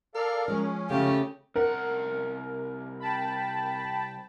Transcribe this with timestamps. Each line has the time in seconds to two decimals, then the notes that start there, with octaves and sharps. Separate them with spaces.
0.15 A4 A#4 D5 F5
0.48 F3 G#3 C#4
0.90 C#3 A3 F4 G4
1.56 C2 A#4 F#5
3.00 G5 A5 B5